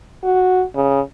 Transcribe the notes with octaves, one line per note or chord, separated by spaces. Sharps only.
F#4
C#3